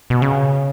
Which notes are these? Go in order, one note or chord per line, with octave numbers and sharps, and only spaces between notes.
B2
C#3